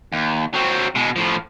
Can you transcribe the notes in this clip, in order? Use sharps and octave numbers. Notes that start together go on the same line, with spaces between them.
D#2
F#3 C4
B2 G#3
A2 F3